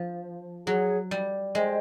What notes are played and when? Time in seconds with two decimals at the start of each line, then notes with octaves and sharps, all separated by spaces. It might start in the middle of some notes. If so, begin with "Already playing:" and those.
Already playing: F3
0.66 F#3 G#4 C#5 F#5
1.11 G3
1.55 G#3 C5 D#5 G5